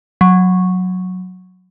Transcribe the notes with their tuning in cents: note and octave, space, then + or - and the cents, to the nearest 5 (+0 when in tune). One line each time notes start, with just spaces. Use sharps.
F#3 -10